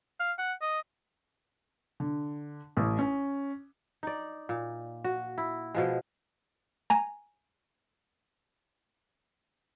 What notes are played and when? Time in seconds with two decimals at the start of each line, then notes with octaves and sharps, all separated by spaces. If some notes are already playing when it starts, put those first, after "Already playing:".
0.19 F5
0.39 F#5
0.62 D#5
2.00 D3
2.77 A1
2.99 C#4
4.03 D#4 D5
4.49 A#2
5.04 F#4
5.38 E4
5.75 B2 F3 G#3
6.90 G#5 A#5